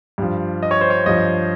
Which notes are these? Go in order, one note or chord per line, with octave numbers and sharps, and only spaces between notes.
G2 F3
D#5
C#5
C5
C#5
G2 F3 D#5